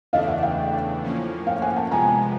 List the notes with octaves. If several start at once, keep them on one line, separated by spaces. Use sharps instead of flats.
E2 C#3 E3 A3 D4 D#5 F5
E5 F#5
F5 G5
A2 F3 A#3 C#4
F5 G5
F#5 G#5
G5 A5
F2 C3 F3 G#3 B3 G#5 A#5